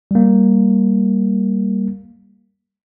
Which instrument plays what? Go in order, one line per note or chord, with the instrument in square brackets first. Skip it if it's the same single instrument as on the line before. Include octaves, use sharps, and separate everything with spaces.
[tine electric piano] G3 A#3